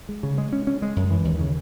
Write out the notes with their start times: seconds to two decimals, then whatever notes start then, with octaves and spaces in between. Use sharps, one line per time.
0.09 G#3
0.23 C#3
0.38 G#3
0.53 C#4
0.67 C#4
0.82 G#3
0.96 F#2
1.11 E3
1.25 D#2
1.40 C#3